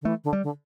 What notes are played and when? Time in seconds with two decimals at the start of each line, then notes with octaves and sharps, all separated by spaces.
0.02 D3
0.05 E3 A3
0.24 D3
0.33 G3
0.43 D3